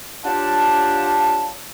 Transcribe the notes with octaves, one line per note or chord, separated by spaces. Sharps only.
D4 F4 G4 C#5 F#5 A5